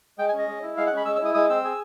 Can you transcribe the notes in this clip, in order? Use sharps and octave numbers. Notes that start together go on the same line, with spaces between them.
G#3 G5
G#5
C#4 D#5
G#3
E4
G#3 F5
F#5
C#4 B5
G#3 E6
E6
E4 D#6
G#3 D#6
C4 E6
G#4